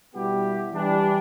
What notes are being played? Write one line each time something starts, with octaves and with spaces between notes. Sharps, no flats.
B2 G3 B3 E4 G4
E3 G3 D4